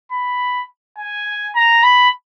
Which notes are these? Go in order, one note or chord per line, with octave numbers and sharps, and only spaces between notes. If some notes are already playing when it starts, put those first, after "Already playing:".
B5
G#5
A#5
B5